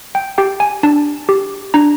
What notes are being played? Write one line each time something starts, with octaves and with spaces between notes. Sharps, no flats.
G5
G4 G5
G#5
D4 A5
G4
D4 A#5